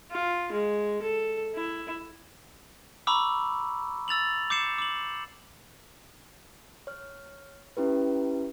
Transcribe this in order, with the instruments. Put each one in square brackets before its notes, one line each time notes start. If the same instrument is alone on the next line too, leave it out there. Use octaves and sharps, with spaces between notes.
[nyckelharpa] F4
G#3
A4
E4
[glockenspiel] A#5 B5 C#6 D6 E6
E6 A6 F7 F#7
D6 G6 C7 C#7 E7
D6 F#7
[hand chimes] C#5 F6
C#4 E4 G4 B4